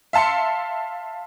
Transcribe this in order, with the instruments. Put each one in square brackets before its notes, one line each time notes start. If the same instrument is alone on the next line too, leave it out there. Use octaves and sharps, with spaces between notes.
[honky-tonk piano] E5 F5 A5 C6 C#7